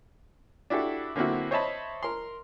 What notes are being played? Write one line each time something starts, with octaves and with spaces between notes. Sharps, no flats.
D4 E4 F#4 G4 A4
D3 A#3 C4 E4 F#4
C5 C#5 D#5 E5 A5 B5
A#4 C6